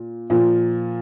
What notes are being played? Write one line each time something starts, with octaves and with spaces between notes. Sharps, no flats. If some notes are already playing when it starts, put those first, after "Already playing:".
Already playing: A#2
A#2 F3